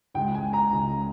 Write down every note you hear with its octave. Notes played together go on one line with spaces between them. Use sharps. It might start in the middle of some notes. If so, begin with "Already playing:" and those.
C#2 C#3 G#3 G5
G#5
A#5
C#2 C#3 G#3